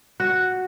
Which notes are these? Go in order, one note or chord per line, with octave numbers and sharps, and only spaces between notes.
F#4